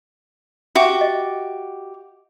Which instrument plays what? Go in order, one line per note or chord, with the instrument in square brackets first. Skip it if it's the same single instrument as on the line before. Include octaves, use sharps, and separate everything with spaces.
[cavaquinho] F#4 G4 D6 [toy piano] E5
[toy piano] D#5